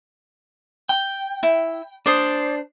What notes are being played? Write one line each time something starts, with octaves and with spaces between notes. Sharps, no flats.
G5
E4
D4 C5 D5 D#6